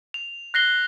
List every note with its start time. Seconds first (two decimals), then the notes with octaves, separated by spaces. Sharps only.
0.14 F7
0.54 F#6 A#6 C7 G7